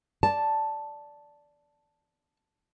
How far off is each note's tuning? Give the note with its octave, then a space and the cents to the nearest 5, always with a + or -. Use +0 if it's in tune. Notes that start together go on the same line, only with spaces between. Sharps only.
D5 -5 A5 +0